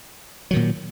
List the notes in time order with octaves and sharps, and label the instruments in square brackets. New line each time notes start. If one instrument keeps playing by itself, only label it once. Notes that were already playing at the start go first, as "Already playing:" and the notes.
[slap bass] F#3
D#3
A#2